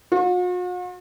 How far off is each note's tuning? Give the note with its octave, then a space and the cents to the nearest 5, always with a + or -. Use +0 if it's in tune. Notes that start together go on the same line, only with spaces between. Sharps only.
F#4 -45